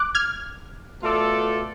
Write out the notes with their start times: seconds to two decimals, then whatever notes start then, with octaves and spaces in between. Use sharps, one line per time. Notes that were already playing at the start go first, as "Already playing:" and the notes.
Already playing: D6 F#6
0.15 F6 G#6
1.01 B2 A3 F4 A4 D5